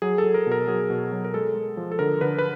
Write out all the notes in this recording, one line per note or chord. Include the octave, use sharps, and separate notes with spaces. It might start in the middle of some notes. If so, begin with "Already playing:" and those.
F#3 G#4
A4
F#3
A#4
B2 A#4
F#3 G#4
B2
F#3
A#4
G#3 A4
G#3
F3
A4
D3 A#4
D3 B4
B4